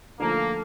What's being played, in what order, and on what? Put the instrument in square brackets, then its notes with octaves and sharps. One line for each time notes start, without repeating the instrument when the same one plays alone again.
[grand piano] D3 F3 A3 [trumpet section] A#3